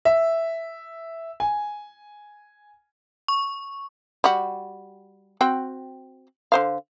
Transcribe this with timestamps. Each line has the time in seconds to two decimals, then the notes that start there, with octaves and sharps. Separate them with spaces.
0.05 E5
1.40 G#5
3.28 C#6
4.24 G3 F#4
5.41 C4 F#4 G5
6.52 D3 C5 F5